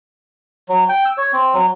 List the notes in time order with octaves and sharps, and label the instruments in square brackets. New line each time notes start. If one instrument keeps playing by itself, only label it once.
[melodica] F#3
G5
E6
C#5
C4
F#3